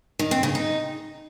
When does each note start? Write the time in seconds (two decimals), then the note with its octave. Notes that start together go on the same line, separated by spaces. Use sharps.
0.19 D#3
0.31 C4
0.43 C#3
0.55 D#4